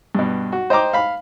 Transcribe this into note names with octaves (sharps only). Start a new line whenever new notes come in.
G2 B2
F#4
C5 D#5 G5 A#5 D6
F5 B5